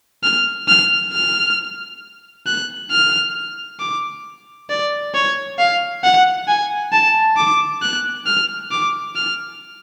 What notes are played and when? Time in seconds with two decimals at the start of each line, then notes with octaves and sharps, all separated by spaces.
0.23 F6
0.68 F6
1.13 F6
2.47 F#6
2.91 F6
3.80 D6
4.69 D5
5.14 C#5
5.59 F5
6.03 F#5
6.48 G#5
6.92 A5
7.37 D6
7.82 F#6
8.26 F6
8.71 D6
9.16 F6